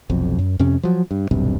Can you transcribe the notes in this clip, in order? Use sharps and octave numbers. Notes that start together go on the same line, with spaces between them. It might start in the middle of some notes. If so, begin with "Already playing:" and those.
F1 B1 F2
F#2
F2 C3 C#4
F3 F#3
G2
D#1 B1 G2 C3